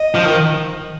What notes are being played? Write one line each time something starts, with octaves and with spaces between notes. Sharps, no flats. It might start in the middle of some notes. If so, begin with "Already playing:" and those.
Already playing: D#5
F3
D#3